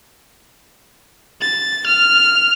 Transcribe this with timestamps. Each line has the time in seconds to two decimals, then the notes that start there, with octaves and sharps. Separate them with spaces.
1.41 A6
1.86 F6